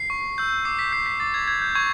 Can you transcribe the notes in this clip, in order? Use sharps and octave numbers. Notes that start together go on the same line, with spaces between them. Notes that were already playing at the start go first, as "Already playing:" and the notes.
Already playing: C7
C#6
E6 G6
D6 C7
B6
G6 C7
B6
D6 A6
G#6
G6 G#6
G6
C#6 G#6